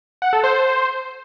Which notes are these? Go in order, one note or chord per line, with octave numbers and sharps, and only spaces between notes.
F#5
A4
C5
C5